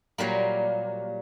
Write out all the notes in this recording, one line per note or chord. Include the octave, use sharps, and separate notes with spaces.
A#2 F#3 G3 A#3